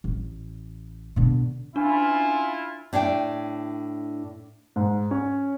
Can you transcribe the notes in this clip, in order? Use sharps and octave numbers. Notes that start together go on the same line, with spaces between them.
A1
B2 D3
C#4 D4 E4 F4
A2 D4 E4 F5 G5
G#2
C#4 C#5